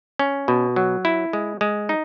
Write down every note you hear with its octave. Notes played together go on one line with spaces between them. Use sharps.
C#4
B2
F#3
E4
G#3
G#3
D#4